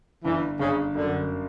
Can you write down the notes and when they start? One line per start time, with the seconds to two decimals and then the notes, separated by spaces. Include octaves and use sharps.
0.24 G1 E3
0.59 G1 C#3
0.95 F#2 D3